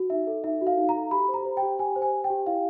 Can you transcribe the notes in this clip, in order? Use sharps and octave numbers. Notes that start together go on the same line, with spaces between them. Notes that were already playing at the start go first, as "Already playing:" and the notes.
Already playing: F#4
D#4 E5
A4
D#4 E5
F#4
F5
D#4
A#5
A4
G4 B5
C5
A#5
C5
G5
G4
G4 G#5
C5
G#5
C5
G5
G4
E4 F5